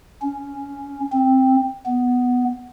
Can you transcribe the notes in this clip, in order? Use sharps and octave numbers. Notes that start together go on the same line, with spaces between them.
C#4
C4
B3